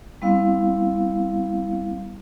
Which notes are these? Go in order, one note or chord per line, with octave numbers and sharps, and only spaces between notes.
G3 B3 C4 E4 F5